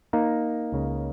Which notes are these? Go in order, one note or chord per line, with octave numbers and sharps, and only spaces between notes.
A#3 D#4
C#2 C#3